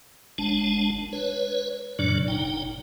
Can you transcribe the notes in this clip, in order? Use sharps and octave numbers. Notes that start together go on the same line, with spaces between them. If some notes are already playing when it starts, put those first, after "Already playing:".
F#1 G#3 D4 A5
B4 C#5
F#2 A#2 C#3 F#3 D4 D5
F#1 D#4 G5